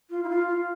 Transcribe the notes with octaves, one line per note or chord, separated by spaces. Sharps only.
F4
E4
F4
F4